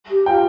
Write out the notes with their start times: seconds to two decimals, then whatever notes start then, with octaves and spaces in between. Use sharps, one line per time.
0.10 G4
0.26 F4 G5